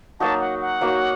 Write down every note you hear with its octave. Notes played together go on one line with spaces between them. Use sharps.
F#3 A#3 D#4 F#4 A5
F#5
F#5
F#3 A#3 D#4 F#4